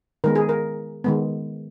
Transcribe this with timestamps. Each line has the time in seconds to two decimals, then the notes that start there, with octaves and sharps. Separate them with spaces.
0.24 D#3 G#3 B3 A#4
0.35 G#4
0.49 A#4
1.04 D#3 G#3 B3